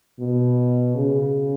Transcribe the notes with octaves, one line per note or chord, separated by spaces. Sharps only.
B2
C#3